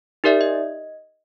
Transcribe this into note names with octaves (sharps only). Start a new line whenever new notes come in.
D#4 G4 A#4 D5 E5
D#5